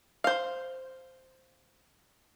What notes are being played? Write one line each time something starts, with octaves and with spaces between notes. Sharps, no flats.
C5 F5